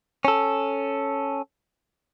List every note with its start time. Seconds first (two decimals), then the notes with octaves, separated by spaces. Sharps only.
0.25 C#4 A4